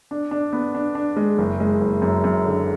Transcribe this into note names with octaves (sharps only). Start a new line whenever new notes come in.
D4
D4
B3
D4
D4
G#3
F#1
G#3
F#1
F#2
F#2
D3